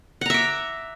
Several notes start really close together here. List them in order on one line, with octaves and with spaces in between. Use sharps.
F#5 A#5 E5 D6